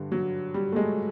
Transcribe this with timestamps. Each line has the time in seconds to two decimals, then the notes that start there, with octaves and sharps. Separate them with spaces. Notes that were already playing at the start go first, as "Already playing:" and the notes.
Already playing: G2 D3
0.12 F#3
0.54 G3
0.72 A3
0.76 G#3